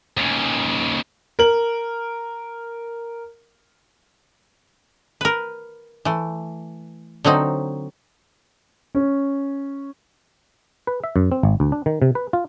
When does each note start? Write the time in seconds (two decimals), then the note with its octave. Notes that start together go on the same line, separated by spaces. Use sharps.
0.17 D#2 C#3
1.39 A#4 F#7
5.21 A#4 B4
6.05 E3 A3
7.24 D3 F#3 C4 D#4
8.95 C#4
10.87 B4
11.04 E5
11.16 F#2
11.32 C4
11.43 G#1
11.60 D2
11.72 D4
11.86 D#3
12.02 C3
12.15 B4
12.33 F4